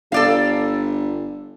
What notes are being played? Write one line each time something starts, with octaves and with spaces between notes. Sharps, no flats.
G1 A4 D5 F5